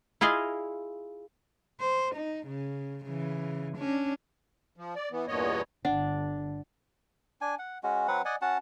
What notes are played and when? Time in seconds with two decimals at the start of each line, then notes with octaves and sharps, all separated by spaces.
0.21 E4 F4 G#4 D#5 F5
1.80 C5
2.16 D#4
2.47 C#3
3.05 C#3 E3
3.78 C#4 D4
4.77 F3
4.95 D5
5.12 E3 B3
5.28 E2 G2 A#2 B3 C#5 D#5
5.85 G1 D3 D4 F#5
7.41 D4 G#5
7.59 F#5
7.83 G#3 C#4 F#4
8.08 F#3 C4 B4 F#5
8.25 D5 D#5 F#5 G#5
8.42 C#4 F#4 F#5 A5